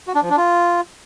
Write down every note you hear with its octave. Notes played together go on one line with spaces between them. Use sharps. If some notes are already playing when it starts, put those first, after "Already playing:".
F#4
D4
F3
D4
F4